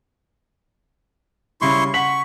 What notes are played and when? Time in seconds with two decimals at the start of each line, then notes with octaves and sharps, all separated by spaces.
1.61 C#3 G3 E4 C6 C#6
1.94 F#5 C#6 B6 F#7